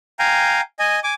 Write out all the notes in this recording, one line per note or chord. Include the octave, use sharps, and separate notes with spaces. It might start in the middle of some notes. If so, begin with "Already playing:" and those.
F5 G5 G#5 A#5
D#5 G#5
G#5 D6